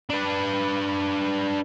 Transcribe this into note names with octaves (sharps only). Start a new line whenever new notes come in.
D4 B4